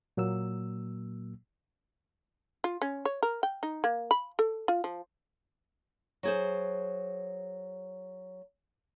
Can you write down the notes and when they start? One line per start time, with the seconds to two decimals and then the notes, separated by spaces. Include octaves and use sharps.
0.17 A#2 F#3 A#3 E6
2.64 F4
2.82 C#4
3.05 C#5
3.23 A#4
3.43 G5
3.63 D#4
3.84 A#3
4.11 B5
4.39 A4
4.68 F4
4.84 F3
6.23 F#3 G#4 C5